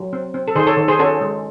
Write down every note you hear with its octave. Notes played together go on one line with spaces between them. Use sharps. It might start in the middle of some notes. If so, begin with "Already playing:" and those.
Already playing: F#3
C4
C4
A4
D#3 G#4 C5
A4 C#5
D#3
G#4 C5
C#4 F#4 A4
G#3